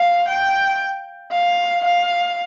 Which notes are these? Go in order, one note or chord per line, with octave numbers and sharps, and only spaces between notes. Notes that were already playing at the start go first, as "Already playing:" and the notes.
Already playing: F5
G5
F5
F5